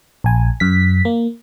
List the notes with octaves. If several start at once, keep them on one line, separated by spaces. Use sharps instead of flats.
A#1 G#5
F#2 B6
A#3